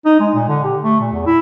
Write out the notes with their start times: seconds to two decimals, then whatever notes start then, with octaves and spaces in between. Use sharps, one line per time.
0.05 D#4
0.20 G#3
0.35 A#2
0.48 D3
0.64 G4
0.83 A3
1.01 A#2
1.13 E2
1.26 E4